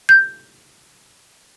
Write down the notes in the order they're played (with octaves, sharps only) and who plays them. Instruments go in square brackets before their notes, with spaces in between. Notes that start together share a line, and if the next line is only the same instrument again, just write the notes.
[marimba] G6